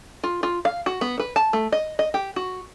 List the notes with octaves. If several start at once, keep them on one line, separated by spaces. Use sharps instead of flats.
F4
F4
F5
F#4
B3
B4
A5
A3
D#5
D#5
G4
F#4